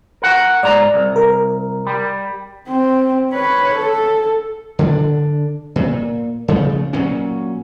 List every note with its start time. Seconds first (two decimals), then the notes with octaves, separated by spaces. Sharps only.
0.22 A#4 F#5
0.63 G#2 D5 A#5
0.94 C2
1.16 A#4
1.87 G3
2.68 C4
3.32 B4 C#5
3.76 A4
4.79 D3 D4
5.76 A#2
6.48 C#3 F3 A3
6.93 A#2 F#3 C#4